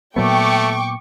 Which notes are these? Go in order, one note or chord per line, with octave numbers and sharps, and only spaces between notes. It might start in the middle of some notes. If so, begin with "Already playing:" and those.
A#2 F#3 A3 B3 G5 C#6 D6